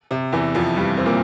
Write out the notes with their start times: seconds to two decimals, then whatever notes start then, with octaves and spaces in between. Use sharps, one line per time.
0.11 C3
0.32 E2 E3
0.55 F2 F3
0.76 G2 G3
0.97 C4
1.06 A#2 A#3